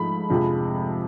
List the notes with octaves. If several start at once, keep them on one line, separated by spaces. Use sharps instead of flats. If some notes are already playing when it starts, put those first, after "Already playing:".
Already playing: G#2 F3 A3 B5
F2 C3 F3 G#3